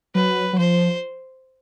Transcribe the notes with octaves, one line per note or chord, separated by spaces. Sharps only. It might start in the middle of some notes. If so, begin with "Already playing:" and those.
F#3 B4
F#3
F3 C5